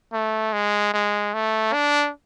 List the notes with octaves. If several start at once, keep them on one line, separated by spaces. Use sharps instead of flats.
A3
G#3
G#3
A3
D4